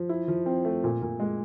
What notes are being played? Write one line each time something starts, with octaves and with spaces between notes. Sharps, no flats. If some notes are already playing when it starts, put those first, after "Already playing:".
Already playing: F3
E4
F3
C4
A3
A#2
A#2
G#3